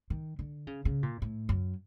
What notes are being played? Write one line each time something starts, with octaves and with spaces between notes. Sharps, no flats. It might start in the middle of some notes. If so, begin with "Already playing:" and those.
D#3
D3
C#3
C#3
A#2
A2
F#2